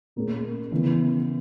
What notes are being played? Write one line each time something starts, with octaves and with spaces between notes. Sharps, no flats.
A#2 A#3 C#4 G#4
C#3 E3 B3 E4 B4